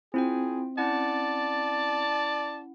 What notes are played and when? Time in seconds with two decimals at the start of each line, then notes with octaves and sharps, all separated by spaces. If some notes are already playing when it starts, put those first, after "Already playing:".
0.14 C4 E4 F4 G#4 G5
0.78 C#4 E4 D5 F#5 A5